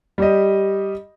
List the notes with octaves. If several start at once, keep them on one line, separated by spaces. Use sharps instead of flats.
G3 G4 D#5